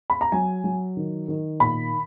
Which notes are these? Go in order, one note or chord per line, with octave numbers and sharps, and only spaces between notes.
B5
A#5
F#3 G#5
F#3
D#3
D#3
A#2 B5